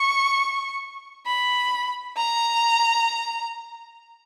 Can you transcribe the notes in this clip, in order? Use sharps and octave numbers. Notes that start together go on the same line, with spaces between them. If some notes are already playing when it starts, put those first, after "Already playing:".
Already playing: C#6
B5
A#5